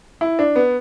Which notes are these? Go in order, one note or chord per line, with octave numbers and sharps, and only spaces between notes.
E4
D4
B3